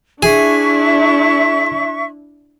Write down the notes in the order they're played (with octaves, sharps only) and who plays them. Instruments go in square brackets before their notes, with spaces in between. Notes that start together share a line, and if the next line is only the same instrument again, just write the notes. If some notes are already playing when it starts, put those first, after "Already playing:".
[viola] D4 E4 [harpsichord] G#4 [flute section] E5 C#6